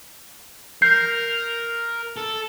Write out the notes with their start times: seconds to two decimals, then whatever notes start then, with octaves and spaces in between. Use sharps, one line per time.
0.82 A#4 G6 C7
2.17 A4